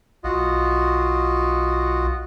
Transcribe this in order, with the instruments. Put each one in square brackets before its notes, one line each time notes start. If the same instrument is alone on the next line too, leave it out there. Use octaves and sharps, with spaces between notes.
[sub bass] B1 [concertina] F4 F#4 D#5